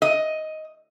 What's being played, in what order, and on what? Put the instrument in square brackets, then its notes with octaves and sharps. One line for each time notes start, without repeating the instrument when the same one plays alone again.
[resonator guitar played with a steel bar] D#5